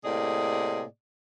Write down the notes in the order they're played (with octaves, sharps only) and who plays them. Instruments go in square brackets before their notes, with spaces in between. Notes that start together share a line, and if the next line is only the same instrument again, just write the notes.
[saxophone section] A2 C3 A#3 G#4 D5 D#5